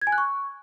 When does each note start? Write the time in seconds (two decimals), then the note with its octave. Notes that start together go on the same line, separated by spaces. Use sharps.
0.02 G#6
0.07 G#5
0.12 F#6
0.18 C#6